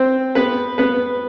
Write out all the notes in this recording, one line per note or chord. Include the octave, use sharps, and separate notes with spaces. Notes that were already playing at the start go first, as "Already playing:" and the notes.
Already playing: C4 C5
B3 B4
B3 B4